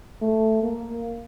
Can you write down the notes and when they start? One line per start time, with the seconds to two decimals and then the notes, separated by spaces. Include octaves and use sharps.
0.22 A3
0.63 A#3